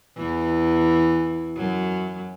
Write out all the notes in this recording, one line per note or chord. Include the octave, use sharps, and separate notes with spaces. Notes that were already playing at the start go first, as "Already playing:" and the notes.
E2 E3
F#2 F#3